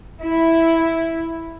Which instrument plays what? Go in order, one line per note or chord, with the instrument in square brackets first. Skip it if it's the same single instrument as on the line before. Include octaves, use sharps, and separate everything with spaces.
[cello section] E4